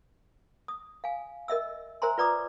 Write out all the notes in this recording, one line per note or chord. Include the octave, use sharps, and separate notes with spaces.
D#6
F5 G#5
A#4 D#5 E5 E6
A#4 C5 E5 G#5 A#5 C6
F4 B4 D5 A#5 D6 D#6